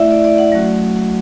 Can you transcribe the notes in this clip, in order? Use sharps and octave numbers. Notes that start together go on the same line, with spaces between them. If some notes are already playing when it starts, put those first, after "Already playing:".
Already playing: A3 E4 D5 E5
D5
D5
F#5
F#3 A3 C#4 F#4